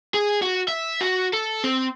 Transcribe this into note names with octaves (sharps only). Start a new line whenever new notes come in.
G#4
F#4
E5
F#4
A4
C4